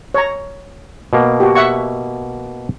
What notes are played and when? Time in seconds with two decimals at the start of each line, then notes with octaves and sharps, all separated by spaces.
0.14 C#5 A#5
1.13 B2 A#3
1.40 F#4 G4
1.55 E5 F#5 C#6